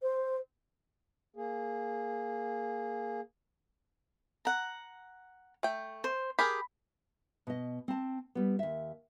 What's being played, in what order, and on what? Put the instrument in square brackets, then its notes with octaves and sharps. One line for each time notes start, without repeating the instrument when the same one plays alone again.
[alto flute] C5
[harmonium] A#3 G#4
[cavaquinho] F#5 A#5
[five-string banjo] A3 G5
[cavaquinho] C5
[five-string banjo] G4 G#4 A#4 [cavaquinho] B5
[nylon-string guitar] B2 D#5
C4 A5
G3 B3
D#2 E5